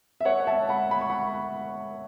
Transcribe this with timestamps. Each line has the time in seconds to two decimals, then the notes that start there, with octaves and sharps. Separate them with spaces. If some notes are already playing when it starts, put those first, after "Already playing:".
0.21 E5
0.25 C#5 F#5
0.40 F#5
0.47 E5 A5
0.69 F#5 B5
0.91 B5
1.01 C#6
1.10 F#5 B5